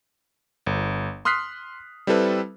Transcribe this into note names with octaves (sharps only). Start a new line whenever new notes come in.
G1
C6 D#6 F6 F#6 B6 C7
G3 C4 E4 A4 B4